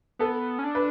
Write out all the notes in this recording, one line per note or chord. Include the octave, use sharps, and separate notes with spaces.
B3 A4
C#4
D4
B4